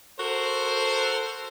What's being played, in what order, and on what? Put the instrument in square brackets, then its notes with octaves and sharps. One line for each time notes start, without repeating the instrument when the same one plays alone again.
[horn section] F#4 A4 A#4 C5